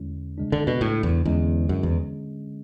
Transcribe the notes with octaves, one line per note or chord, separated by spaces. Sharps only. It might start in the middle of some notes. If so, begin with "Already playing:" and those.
Already playing: E2 D3 G#3 C#4 E4
D2 C#3 G#3 D4
D3
B2
A2
E2
E2 D3 G#3 C#4
F#2
E2